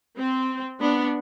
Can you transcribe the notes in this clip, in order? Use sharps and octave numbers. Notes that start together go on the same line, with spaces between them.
C4
B3 D4